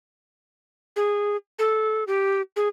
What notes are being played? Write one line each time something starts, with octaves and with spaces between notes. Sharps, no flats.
G#4
A4
G4
G#4